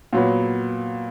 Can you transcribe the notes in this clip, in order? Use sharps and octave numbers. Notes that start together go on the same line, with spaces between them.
A#2 F#3 B3